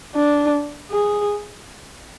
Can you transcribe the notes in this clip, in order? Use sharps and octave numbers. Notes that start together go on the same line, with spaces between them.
D4
G#4